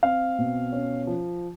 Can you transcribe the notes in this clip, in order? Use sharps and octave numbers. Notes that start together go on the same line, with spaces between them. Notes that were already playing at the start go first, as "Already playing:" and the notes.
C4 F5
B2
C#4
F3